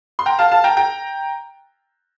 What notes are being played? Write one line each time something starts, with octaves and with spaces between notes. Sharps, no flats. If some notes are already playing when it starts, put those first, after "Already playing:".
C6
G5 A#5
F5 A5
F5 A5
G5 A#5
G5 A#5